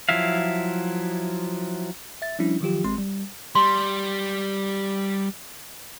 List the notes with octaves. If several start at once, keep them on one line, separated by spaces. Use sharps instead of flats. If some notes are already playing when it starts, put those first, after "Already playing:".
F3 F#3 E4 E5 F5
E5 A6
F3 G3 C#4 D4 E4
D#3 F3 F#3 F4 G4
G#1 G#3 C4 C6
G3
G3 C6